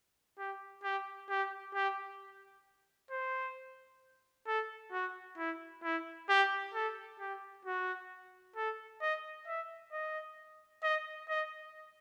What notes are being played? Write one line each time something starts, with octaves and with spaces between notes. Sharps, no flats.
G4
G4
G4
G4
C5
A4
F#4
E4
E4
G4
A4
G4
F#4
A4
D#5
E5
D#5
D#5
D#5